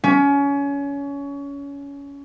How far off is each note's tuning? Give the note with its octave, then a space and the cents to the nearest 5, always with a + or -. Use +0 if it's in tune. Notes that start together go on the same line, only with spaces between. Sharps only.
C#4 +25